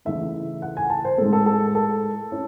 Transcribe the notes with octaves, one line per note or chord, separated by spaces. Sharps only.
C#3 E3 A3 D#4 E5
F#5
G#5
A5
C5
A2 G#3 D#4 A4
A4
A4
A4
C#4 E4